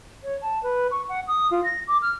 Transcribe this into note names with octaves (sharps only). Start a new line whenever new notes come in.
C#5
A5
B4
C#6
F#5
D#6
F4
A#6
D6
F6